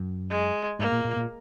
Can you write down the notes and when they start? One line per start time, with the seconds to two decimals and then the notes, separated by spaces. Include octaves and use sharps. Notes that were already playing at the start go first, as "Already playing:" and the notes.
Already playing: F#2
0.31 G#3
0.79 G#2 A#3
0.92 A#2
1.04 A#2
1.16 A#2